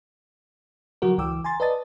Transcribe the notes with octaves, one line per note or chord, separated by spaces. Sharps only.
D3 F3 F#3 F#4 A#4
C#2 E3 G5 D6 E6
G#5 A#5 C6 A6
B4 D5 D#5 A5 D#6 A6